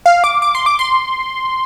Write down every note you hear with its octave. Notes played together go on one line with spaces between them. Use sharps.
F5
D6
D6
C6
D6
C6